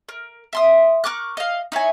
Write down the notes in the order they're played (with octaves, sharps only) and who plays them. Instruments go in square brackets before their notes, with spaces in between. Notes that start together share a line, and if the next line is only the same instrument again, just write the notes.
[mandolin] A#4
E5 C6 D#6
A#4 C#6 D6 F#6
D#5 F5
D#4 E4 C#5 G#5